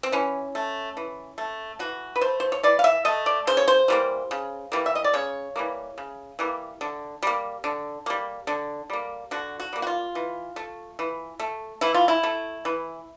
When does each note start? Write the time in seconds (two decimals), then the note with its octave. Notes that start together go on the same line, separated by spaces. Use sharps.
0.03 C4
0.12 E3 C#4
0.55 A3
0.97 E3
1.38 A3
1.79 E3 F#4
2.16 B4
2.21 A3 C5
2.40 C5
2.52 C#5
2.63 E3 D5
2.79 F5
2.84 E5
3.05 A3 D#5
3.26 D5
3.47 C#3 C5
3.57 C#5
3.68 C5
3.88 E3 G3 A#3
4.31 C#3
4.72 E3 G3 A#3
4.86 E5
4.95 D#5
5.04 D5
5.14 C#3 C#5
5.56 E3 G3 A#3
5.98 C#3
6.39 E3 G3 A#3
6.81 D3
7.23 G3 A#3
7.64 D3
8.06 G3 A#3
8.47 D3
8.90 G3 A#3
9.31 D3 F#4
9.60 F#4
9.73 G3 A#3
9.82 F#4
9.87 F4
10.15 E3
10.56 A3
10.99 E3
11.40 A3
11.81 E3 E4
11.94 F4
12.08 E4
12.23 A3
12.65 E3